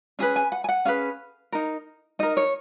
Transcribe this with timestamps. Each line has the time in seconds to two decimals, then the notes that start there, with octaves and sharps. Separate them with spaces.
0.19 C#4 G#4 B4
0.36 G#5
0.52 F#5
0.64 G#5
0.69 F#5
0.85 C#4 G#4 B4 F5
1.52 D#4 A#4
2.19 D#4 A#4 D#5
2.37 C#5